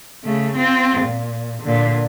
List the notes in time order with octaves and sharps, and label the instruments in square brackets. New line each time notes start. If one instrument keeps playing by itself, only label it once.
[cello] C#3 A3
C4 F4
A#2
A#2 D3